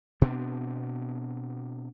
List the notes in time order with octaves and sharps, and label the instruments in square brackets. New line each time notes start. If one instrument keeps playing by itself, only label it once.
[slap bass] B2 B3 C4 D4